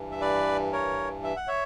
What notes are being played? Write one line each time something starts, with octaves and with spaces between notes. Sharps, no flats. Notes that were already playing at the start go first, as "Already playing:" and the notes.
Already playing: G2 E3
E5
B4 D5
A#4 C#5
E5
F#5
C#5 E5